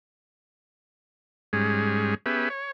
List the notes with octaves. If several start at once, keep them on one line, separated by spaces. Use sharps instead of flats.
G#2 G3 G#3 C#4 G#4
B3 C#4 G4 G#4 B4 E5
C#5